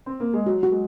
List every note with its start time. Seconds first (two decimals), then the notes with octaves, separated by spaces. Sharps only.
0.06 C4
0.20 A#3
0.33 G#3
0.46 F#3 F#4
0.63 F#4
0.72 G#3